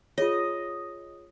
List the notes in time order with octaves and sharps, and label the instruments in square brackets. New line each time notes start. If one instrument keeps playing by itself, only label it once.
[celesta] F4 G#4 C#5 [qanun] D#5